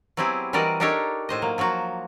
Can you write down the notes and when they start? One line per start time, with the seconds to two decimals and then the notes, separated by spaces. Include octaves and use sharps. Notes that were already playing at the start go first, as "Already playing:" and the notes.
0.17 F#3 B3 C4 E4 G4 G#4
0.53 E3 G3 F#4 A#4 D5 D#5
0.80 D4 D#4 G4 A4 A#4 C#5
1.29 A2 C5 D#5
1.42 F#3 A#3
1.58 F3 F#3 A#3 F#4